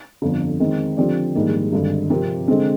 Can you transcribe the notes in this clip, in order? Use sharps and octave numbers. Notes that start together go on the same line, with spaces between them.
G1 F2 D3
D#3 G#3 C4
D3 F3 C4 G4 D5
A#1 G#2 D#3 G3 A#3
G#1 G2 D3
C3 F3 C4 G4 A#4
D3 G#3 C4